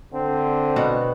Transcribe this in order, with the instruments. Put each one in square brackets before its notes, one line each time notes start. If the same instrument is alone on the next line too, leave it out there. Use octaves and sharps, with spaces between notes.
[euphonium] D3 [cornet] C4
[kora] B2 B3 F#4